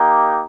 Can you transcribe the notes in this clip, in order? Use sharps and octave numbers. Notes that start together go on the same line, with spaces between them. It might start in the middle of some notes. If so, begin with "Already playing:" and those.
Already playing: A#3 D#4 G4